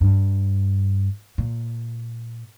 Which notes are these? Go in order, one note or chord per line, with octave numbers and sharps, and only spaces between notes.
G2
A#2